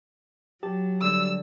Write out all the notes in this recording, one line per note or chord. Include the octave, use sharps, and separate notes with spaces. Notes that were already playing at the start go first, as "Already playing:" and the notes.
F#3 G4 A5
D3 G3 E6